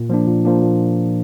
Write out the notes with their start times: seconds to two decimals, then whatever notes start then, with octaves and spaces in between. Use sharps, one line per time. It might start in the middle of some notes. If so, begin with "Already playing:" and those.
Already playing: A#2
0.10 F3 A#3 D4
0.27 A#2
0.45 F3 A#3 D4
0.62 A#2